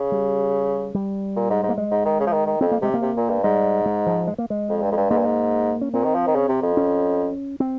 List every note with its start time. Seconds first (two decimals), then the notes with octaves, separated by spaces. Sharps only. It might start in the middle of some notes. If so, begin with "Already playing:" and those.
Already playing: C#3
0.12 G3
0.95 G3
1.36 A#2
1.50 G#2
1.63 G#2
1.69 A#3
1.78 G#3
1.91 G#2
2.05 D#3
2.20 C#3
2.27 F3
2.33 D#3
2.46 D#3
2.61 F2 C4
2.71 A#3
2.82 C3 G#3
2.94 A#3
3.02 C3
3.17 A#2
3.30 G2
3.43 G#2 G3
3.86 G#3
4.07 F3
4.27 G#3
4.38 A#3
4.50 G#3
4.69 F2
4.82 G2
4.91 F2
4.97 G2
5.10 G#2 A#3
5.17 G2
5.25 G#2
5.81 C#4
5.94 A#2 C4
6.04 D#3
6.15 F3
6.27 D#3
6.35 C#3
6.49 C3
6.62 F2
6.77 C#4
7.60 C4